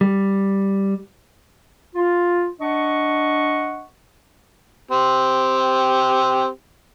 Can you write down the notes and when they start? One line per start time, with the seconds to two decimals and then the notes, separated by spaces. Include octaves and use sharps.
0.01 G3
1.95 F4
2.60 D4 D#5 F#5 C#6
4.91 C4 G4